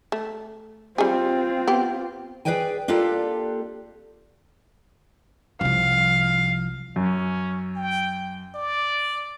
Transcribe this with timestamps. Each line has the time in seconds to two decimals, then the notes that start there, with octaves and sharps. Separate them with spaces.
0.12 A3
0.98 G3 C4 F4 G#4
1.67 B3 G4
2.45 G#4 A#4 B4 D5 G5 G#5
2.88 A#3 D4 F4 G4 A4 D5
5.61 C2 F3 F5
6.96 F#2 C#4
7.76 G5
8.55 D5